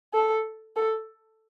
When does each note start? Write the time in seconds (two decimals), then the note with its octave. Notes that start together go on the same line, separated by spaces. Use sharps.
0.14 A4
0.76 A4